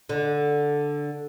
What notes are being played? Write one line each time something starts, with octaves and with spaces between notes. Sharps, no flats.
D3